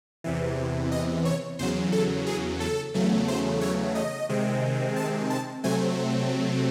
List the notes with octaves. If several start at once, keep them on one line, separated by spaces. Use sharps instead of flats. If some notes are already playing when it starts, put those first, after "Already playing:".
E2 C3 E3
D#5
C#5
E2 C#3 F#3 C5
A4
G#4
A4
E2 C#3 F#3 A3
C5
C#5
D#5
C3 D#3 G#3 C4
A5
A5
C3 F#3 A3 C4 G#5